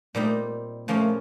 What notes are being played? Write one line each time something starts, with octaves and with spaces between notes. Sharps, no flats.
A#2 G3 A3 C4 D#4
C#3 F3 A3 A#3 C#4 F4